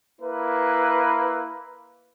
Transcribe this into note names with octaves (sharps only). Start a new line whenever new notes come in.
A#3 E4 B4